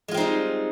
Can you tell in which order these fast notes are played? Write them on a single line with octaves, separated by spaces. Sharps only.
G#3 F4 C4 D#4 G3